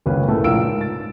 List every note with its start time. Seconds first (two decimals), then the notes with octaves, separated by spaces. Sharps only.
0.06 F#1 C#2 A#3 C#4 B4
0.28 A2 C#3 A3
0.44 A#1 F4 A#4 E6 D7
0.64 G#2
0.81 A6